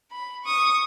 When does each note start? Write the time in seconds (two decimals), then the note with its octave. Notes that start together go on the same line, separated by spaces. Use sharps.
0.11 B5
0.44 C#6 D#6